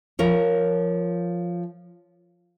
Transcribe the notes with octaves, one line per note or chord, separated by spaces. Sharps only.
F3 A#4 C#5